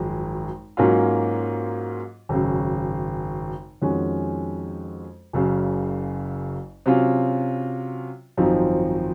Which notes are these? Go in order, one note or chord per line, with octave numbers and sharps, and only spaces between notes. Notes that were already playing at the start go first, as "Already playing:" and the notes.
Already playing: G#1 F#2 F3 G#3
G#2 F#3 A#3 C#4 F4
G#1 F#2 C#3
F2 D#3 G#3 C#4 F#4
F#1 F#2 C#3
C3 F#3 C#4 F4
G#1 F#2 F3 C4 D#4